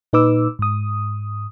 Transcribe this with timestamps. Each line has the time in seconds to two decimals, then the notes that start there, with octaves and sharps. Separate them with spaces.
0.13 A#2 D#4 B4 D6 E6
0.59 G#2 D#6